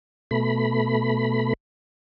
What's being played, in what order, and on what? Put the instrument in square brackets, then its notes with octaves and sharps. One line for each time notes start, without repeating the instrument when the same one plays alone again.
[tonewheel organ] B2 A3 B5